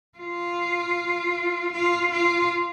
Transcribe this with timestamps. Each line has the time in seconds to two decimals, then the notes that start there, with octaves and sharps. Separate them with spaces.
0.18 F4
1.73 F4
2.11 F4